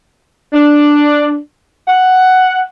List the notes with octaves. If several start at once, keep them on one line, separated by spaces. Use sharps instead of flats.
D4
F#5